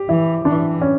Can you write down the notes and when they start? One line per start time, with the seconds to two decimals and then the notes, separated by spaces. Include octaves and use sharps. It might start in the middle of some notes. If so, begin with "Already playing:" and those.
Already playing: G4
0.09 E3 E4
0.45 E3 D4
0.81 C#4